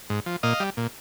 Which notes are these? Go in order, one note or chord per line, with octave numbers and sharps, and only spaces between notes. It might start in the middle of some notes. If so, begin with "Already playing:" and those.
G#2
F3
A#2 D#5 F5
G3
A#2